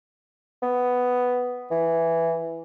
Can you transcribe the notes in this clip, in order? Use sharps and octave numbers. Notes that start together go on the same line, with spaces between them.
B3
E3